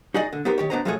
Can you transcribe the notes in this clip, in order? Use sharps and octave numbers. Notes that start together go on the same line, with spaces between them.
D#4 F#4 G#4 D5 D#5
D3
B3 D#4 G4 A#4 C5
D#3 G4 C#5
B3 D4 F#4 C5 D#5 A#5
F3 G#3 A3 F#4 G#4 C#5